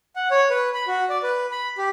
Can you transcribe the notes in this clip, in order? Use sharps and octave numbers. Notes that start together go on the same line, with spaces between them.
F#5
C#5
B4
B5
F#4
D5
B4
B5
G4